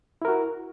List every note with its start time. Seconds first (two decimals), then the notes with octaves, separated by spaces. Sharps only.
0.22 E4
0.25 A#4
0.28 F#4